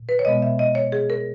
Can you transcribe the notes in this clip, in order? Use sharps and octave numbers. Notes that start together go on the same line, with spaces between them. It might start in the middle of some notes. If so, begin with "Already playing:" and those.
Already playing: A#2
B4
C#5
B2 G#3 B3 D#5
E5
D#5
C#5
G#4
A#4